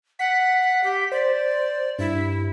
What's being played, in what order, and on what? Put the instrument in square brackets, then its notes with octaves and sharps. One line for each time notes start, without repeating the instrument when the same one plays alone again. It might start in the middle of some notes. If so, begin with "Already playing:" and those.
[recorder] F#5 [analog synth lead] B6
[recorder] G4
[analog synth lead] C5 [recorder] D5
[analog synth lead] G2 [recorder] E4